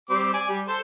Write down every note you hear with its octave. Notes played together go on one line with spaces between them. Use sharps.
G3 C4 D6
D5 G#5 D6
G3
A4 C5 A5